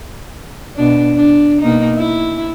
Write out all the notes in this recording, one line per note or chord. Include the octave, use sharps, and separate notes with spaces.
B2 D4
D4
B2 A#3 D#4
E4